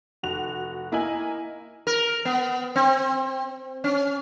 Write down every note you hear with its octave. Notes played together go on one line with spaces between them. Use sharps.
F1 F#4 F7
A#3 E4 D#5 G#5 F#7
A#4
B3
C4
C#4